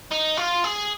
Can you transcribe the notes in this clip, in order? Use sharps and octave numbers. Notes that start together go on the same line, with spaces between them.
D#4
F4
G#4